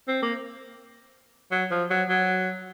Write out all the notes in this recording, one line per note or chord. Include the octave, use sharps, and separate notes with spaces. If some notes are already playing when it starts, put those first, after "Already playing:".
C4
A#3
F#3
F3
F#3
F#3